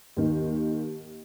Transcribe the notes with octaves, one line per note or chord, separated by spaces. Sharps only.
D#2 D#3